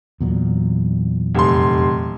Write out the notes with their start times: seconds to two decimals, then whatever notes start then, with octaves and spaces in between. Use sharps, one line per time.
0.21 E2 A#2 F#3
1.35 F1 C6